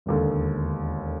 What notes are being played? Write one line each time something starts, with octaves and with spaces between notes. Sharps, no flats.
E1 D#2 D3